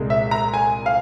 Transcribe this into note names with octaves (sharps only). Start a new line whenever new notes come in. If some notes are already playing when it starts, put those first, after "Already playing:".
Already playing: C2 A#2 G#3
E5
A#5
G#5
F5